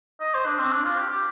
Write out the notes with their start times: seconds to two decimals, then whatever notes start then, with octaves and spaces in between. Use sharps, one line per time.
0.21 D#5
0.34 C5
0.46 D4
0.59 C4
0.72 D4
0.84 F4
0.98 G4
1.10 G4